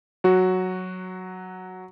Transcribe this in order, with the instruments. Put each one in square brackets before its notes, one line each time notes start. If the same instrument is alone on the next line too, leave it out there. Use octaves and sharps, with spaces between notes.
[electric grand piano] F#3 F#4